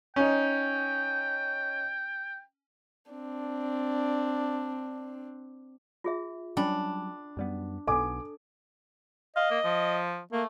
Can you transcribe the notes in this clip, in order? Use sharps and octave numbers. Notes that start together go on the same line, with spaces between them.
C#4 D#4 G5
C4 D4
F4 G#4 E5
F#3 G3 C#4 D4 G5 B5
F#2 G3 B3
B1 B3 A4 G#5 D6
D#5 F5
A#3
F3
A3 A#3